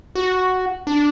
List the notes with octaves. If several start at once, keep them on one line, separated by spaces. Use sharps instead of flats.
F#4
D4